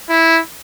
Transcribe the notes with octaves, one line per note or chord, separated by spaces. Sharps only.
E4